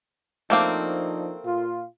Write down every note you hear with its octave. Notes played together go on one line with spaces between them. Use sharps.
F3 A3 A#3 C4 D4 D#4
A#2 F4